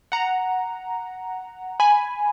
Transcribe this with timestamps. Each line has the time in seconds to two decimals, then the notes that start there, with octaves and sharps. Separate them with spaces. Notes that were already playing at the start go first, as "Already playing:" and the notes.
0.12 F#5 A#5
1.80 G#5 B5